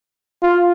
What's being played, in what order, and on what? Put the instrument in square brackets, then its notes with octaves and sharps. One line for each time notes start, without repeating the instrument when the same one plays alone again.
[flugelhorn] F4